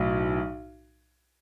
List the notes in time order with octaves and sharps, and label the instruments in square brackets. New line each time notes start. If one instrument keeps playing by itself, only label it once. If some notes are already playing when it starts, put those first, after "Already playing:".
Already playing: [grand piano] B1 A2 F#3